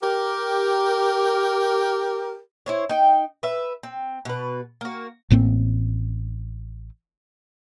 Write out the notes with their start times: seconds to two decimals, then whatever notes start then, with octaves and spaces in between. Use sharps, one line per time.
0.03 G4 A#4
2.66 E4 C5 C#5
2.89 D#4 G5
3.43 B4 E5
3.83 C4
4.25 B2 B4
4.81 A#3 F#4
5.30 A1 A2 A#3 C4